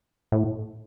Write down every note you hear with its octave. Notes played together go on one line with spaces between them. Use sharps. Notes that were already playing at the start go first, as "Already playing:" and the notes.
A2